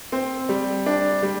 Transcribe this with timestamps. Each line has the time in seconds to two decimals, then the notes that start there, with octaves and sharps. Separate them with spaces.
0.12 C4
0.49 G3
0.86 D4
1.22 G3